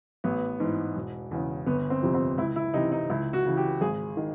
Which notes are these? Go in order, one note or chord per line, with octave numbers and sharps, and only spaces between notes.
A1 B3
G#2 E3
E1
E2 C#3
G1 B3
C4
F2 C3 F3
C4
C#2 E4
E4
C3 E3 D#4
D#4
C#2 E4
F#4
C#3 E3
G4
G#1 G#4
D#3